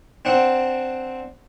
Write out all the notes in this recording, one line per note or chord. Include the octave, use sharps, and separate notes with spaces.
C4 D4 F#5